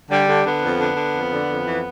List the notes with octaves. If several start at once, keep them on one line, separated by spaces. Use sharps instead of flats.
D3 G3
D3
D3 B3
F2
D3
D3
F2
D3
F2
E3